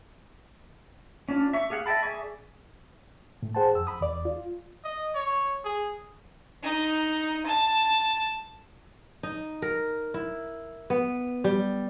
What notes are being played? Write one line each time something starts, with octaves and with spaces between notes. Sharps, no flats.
C#4 D4 F4
E5 C#6
G4 G#4 F5 F#5
D#5 E5 G5 A5 B5
G#4 D5 E5 G#5 C#6
A2
G#4 C5 F#5 G5 A5
F2 E6
B5 D#6
E2 D5
F4
D#5
C#5
G#4
D#4
A5
D#4
A#4
E4
B3
G3